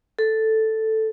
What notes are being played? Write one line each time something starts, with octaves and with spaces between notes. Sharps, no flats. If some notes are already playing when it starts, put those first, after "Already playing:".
A4